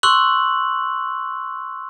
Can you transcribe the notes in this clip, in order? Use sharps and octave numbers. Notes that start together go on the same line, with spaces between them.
C6 C#6 E6 F#6 F#7